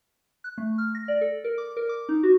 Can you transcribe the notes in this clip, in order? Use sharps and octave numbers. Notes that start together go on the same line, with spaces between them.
F#6
A3
F6
A#6
D5
A4
A#4
D6
A#4
D6
D#4
F#4